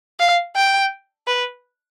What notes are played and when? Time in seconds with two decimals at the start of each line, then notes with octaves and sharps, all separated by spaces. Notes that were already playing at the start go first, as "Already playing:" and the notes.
0.20 F5
0.56 G5
1.27 B4